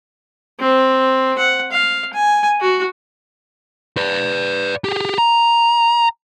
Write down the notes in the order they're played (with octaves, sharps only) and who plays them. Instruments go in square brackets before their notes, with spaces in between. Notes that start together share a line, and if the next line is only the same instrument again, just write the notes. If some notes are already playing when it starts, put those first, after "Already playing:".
[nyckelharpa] C4
F#5
F5
G#5
F#4
[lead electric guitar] B4 D5
G4 G#4
A#5